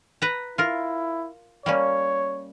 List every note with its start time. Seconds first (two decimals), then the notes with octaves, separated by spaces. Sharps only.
0.22 B4 A#5
0.58 E4 F4 A#4
1.66 G3 A#3 C#4 C#5